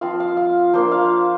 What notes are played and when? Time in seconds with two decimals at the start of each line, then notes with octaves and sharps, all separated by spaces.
0.01 F3 C4 F4 F5
0.20 F5
0.37 F5
0.74 F3 A#3 D4 C5
0.92 F5